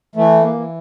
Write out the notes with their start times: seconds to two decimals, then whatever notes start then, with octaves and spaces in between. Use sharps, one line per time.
0.15 E3 A3
0.41 A#3
0.54 E3